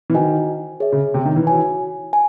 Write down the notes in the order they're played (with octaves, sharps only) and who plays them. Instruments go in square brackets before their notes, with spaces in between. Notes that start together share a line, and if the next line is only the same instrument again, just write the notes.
[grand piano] E3
[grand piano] D#3 [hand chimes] F#4 C5 D#5 G#5
[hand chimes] G#4 C#5 E5
[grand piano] C#3
C3
D#3
E3
[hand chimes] F#4 C#5 G#5
G#5